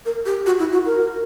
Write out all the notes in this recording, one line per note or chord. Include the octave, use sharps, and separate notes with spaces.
A#4
G4
F#4
E4
F#4
A#4